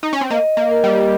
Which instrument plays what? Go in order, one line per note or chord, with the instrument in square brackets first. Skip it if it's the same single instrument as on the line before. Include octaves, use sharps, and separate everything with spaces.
[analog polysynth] D#4
C#4
C4
[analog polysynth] A#3 [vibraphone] D#5
[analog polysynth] A#3
[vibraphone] A#4
[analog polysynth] G3